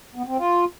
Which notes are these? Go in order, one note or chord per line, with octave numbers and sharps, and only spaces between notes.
B3
C4
F4